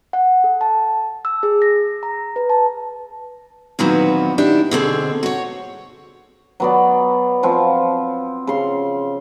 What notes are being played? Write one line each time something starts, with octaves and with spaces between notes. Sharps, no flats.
F#5
A4
A5
E6
G#4
A#6
A#5
B4
A5
A#2 D#3 E3 F#3 B3 C4
D#3 D4 E4 G4
B2 D3 C4 G#4
F#4 C#5
F#3 B3 D5
F3 C4
C#3 C6